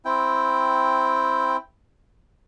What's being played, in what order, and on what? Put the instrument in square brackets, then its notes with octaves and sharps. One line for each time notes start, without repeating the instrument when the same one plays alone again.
[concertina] C4 E4 G5